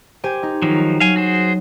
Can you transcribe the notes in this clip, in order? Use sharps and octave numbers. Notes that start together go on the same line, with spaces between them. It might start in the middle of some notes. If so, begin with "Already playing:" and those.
G4 C5 G#5
D#4
D#3 F3 F#3
F#3 F5 G#5
F#4 G#4 C5